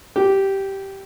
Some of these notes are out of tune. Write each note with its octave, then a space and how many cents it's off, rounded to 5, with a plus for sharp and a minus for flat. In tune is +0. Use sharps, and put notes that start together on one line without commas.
G4 -10